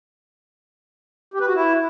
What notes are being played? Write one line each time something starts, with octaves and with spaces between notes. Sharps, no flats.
G4
B4
F#4
E4